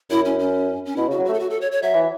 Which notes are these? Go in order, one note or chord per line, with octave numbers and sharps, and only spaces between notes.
F#2 E4
C#4
C#4
C#4
B2 E4
C#3
F#4
F#3
A3 F#4
A4
F#4
A4
C#5
C#5
F#3 E5
E3